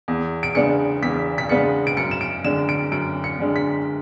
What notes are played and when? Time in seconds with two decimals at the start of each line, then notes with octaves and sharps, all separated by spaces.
0.08 E2
0.43 D7
0.55 C#3 G#3 B3 D4 C#7
1.02 E2 B6
1.38 B6
1.49 C#3 G#3 B3 D4 C#7
1.87 D7
1.97 F#2 C#7
2.11 E7
2.21 D7
2.44 D3 G#3 D4 E7
2.69 D7
2.92 F#2 D7
3.24 C#7
3.39 D3 G#3 D4
3.56 B6